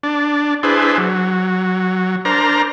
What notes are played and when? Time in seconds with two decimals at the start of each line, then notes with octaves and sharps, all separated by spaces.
0.03 D4
0.63 D4 E4 G#4 B4 C5
0.98 F#3
2.25 D4 A#4 C5 A#5